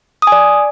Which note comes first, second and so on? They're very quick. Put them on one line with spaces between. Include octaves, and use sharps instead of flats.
D#6 G#5 D5